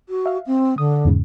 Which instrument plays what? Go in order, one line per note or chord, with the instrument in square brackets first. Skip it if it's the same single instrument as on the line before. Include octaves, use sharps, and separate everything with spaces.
[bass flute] F#4
[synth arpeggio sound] E5 F5
[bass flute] C4
[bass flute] D3 [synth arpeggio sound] D#6
[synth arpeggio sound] E2 G#2 C#3